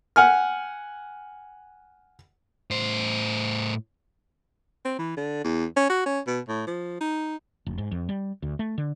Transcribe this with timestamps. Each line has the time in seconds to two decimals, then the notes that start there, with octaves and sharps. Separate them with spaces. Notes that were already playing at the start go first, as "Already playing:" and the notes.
0.16 F#5 G#5 F6
2.71 A2 C5
4.85 C4
4.99 E3
5.17 D3
5.44 E2
5.77 C#4
5.90 F#4
6.06 C#4
6.27 B2
6.48 A2
6.67 F3
7.01 D#4
7.66 F1
7.78 G#2
7.92 F2
8.09 G3
8.43 D2
8.59 A3
8.78 D3